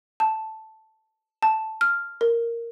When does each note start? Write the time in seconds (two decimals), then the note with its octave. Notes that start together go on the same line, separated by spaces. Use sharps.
0.20 A5
1.42 A5
1.81 F6
2.21 A#4